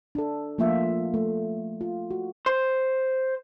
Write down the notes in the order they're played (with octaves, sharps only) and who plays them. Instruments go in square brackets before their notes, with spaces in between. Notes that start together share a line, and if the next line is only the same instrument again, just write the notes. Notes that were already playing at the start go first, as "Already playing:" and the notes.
[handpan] D4 A4
F3 A3 A#3 F4 E5
A3
F4
F#4
[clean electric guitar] C5